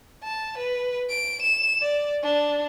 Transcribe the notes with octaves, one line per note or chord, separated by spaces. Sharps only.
A5
B4
D7
E7
D5
D4